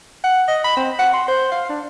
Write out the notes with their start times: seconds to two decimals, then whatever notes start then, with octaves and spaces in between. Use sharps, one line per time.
0.24 F#5
0.48 D#5
0.64 B5
0.77 C4
0.99 F#5
1.14 C6
1.28 C5
1.52 F5
1.69 D4